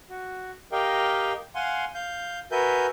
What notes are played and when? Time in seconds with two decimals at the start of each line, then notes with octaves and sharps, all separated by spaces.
0.10 F#4
0.72 G4 A#4 D#5 F5 G5
1.55 F5 F#5 G#5 C6
1.95 F5 G6
2.52 F#4 A#4 B4 E5 G#5 G6